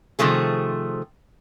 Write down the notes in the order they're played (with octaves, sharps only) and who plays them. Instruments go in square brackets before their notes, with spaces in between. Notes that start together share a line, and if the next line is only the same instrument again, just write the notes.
[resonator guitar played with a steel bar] C3 D#3 F3 A3 G#4